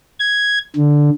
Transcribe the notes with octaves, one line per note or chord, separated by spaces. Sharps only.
G#6
D3